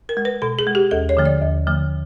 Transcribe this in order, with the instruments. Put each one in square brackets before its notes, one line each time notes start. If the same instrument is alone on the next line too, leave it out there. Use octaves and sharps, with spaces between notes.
[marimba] A#4
G#3
B4
B2 A4
G#4
G#3
G4
D#2 A4
C#5
D3 F3 A3
D5
D#2
D3 F3 A3